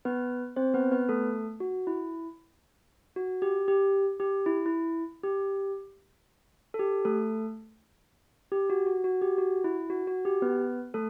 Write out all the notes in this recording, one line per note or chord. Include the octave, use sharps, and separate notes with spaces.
B3 B4
C4 C5
B3 B4
B3 B4
A3 A4
F#4
E4
F#4
G4
G4
G4
E4
E4
G4
A4
G4
A3 A4
G4
F#4
F#4
F#4
G4
F#4
E4
F#4
F#4
G4
B3 B4
A3 A4